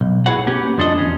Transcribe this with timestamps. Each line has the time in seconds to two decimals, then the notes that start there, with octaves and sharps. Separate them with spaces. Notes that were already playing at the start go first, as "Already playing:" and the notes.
0.01 B1
0.26 E4 F#4 G#4 B4 C#5 F#5
0.47 A#3 B3 C#4 F#4 G4
0.78 F2 F3 D4 A4 D#5
0.98 E2 C#4